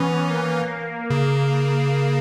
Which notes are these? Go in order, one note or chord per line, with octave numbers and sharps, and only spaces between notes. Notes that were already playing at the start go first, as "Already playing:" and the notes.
Already playing: E3 B3 C#4
A#3
A#3
C#3